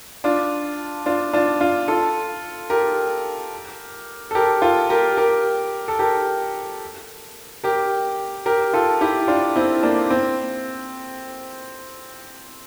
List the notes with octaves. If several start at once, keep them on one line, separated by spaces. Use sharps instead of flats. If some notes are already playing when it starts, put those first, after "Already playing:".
D4 F4
D4 F4
D4 F4
D4 F4
F4 A4
G4 A#4
A4
G4 A#4
F4 A4
G4 A#4
G4 A#4
A4
G4 A#4
G4 A#4
G4 A#4
F4 A4
E4 G4
D4 F4
C4 E4
A#3 D4
C4